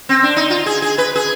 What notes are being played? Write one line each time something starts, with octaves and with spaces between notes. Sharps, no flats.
C4
D4
D#4
F4
G#4
G#4
B4
G#4